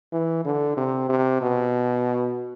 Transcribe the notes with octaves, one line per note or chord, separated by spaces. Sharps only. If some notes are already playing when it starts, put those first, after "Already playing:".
E3
D3
C3
C3
B2